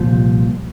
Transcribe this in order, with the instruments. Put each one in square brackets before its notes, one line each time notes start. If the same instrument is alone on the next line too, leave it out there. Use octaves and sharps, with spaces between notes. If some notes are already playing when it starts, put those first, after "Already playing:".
Already playing: [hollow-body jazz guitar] C2 A#2 F3